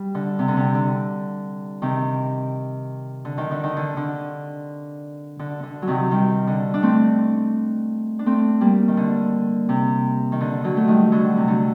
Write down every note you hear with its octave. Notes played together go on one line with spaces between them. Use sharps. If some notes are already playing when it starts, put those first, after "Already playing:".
Already playing: G3
D3
C3
D3
C3
D3
C3 D#3
D3
D#3
D3
D#3
D3
D3
D3
D3
F#3
C3 D#3
D#3 G3
D3
D4
A3 C4
D4
A3 C4
G3 A#3
D#3
D3
C3
D#3
D3
D3 F#3
A3
D#3 G3
D3 F#3
C3
D3